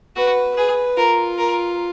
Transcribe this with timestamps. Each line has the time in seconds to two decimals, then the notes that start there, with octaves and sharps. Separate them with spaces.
0.16 F#4 B4
0.56 G#4 B4
0.97 F4 A#4
1.38 A#4